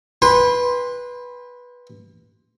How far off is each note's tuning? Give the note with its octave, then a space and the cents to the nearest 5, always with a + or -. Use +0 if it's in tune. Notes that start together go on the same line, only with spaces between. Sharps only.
B4 -10 G5 +40 C6 +0